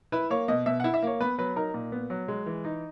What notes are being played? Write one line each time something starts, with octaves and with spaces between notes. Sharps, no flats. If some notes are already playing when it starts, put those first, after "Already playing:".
E4 B4
A#3 C#5
B2 D#5
B2 E5
F#5
E4
E5
A#3 C#5
B3 B4
F#3 B4
D#4 A#4
A#2
B3
F#3
G#3
E3
D#4